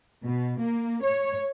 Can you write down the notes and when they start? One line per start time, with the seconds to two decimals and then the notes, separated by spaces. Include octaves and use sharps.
0.24 B2
0.60 A#3
1.03 C#5